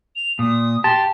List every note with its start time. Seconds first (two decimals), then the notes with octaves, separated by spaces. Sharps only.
0.16 F7
0.39 A#2 D#6
0.84 G4 A5 C6